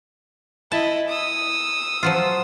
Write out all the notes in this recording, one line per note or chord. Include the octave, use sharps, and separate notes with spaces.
E4 D#5 A5
D#6 E6
F3 F#3 F4